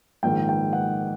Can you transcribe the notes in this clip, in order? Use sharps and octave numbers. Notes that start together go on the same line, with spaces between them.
A#1 G#2 D#3 G5
G5
F#5